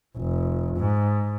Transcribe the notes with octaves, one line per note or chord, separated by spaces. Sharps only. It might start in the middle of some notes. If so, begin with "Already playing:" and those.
F1
G#2